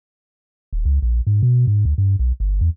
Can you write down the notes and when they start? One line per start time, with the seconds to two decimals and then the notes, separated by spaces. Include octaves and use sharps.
0.73 D#1
0.85 C#2
1.02 A#1
1.27 G#2
1.43 B2
1.67 G#2
1.85 D2
1.98 G2
2.19 B1
2.40 G1
2.61 E2